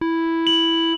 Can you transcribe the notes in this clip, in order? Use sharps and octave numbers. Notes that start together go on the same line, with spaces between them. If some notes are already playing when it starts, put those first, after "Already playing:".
E4
F#7